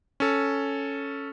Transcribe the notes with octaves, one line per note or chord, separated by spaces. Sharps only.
C#4 A4